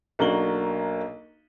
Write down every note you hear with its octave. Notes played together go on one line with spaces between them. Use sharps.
B1 A#3 D4 F#4 F#7 G7